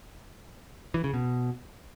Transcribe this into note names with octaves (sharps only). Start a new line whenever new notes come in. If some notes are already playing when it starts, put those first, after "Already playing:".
E3
C#3
B2